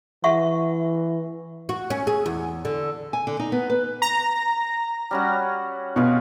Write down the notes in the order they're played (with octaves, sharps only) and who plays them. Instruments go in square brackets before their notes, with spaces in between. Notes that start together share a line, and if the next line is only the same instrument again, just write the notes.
[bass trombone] E3 [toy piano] E5 F#5 C#6
[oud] F#4
C#4
G#4
E2
D3
[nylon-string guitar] G#5
D3
D#4
B3
B4
[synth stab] A#5 A#6
[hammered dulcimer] G3 C#4 F#4
[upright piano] B2 [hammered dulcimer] F4 G#4 B4